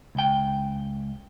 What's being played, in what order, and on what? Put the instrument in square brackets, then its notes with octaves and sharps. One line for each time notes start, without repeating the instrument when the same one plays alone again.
[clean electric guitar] C#2 G5